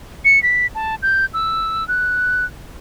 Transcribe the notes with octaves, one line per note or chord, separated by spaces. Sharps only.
C#7
B6
A5
G6
E6
F#6